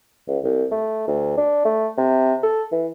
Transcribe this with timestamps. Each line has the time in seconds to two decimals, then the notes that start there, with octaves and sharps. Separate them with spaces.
0.28 C#2
0.44 C2
0.72 A3
1.08 D2
1.38 D4
1.65 A3
1.98 C3
2.43 A4
2.72 E3